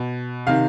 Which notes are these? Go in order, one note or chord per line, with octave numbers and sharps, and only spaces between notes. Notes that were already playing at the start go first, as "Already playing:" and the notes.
Already playing: B2
C3 D#3 F5